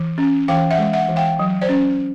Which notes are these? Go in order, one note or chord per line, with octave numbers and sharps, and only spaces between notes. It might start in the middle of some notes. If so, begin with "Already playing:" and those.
Already playing: E3
C#4
E3 F5 G5
E5 F#5
G#3
E5 F#5
E3
F5 G5
F#3
C5 D5
C#4